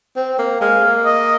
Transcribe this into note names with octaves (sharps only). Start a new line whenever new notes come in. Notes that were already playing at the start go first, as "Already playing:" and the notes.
C4
A#3
G#3 F5
A#3
D#5